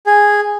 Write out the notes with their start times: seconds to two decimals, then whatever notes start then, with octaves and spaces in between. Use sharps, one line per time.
0.07 G#4